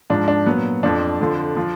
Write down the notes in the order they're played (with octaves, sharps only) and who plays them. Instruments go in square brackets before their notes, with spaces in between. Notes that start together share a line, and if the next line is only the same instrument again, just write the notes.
[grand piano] G#2 F3 D4
D4
A#2 F#3 B3
F2 F3 D4
F2 D3 F3
F3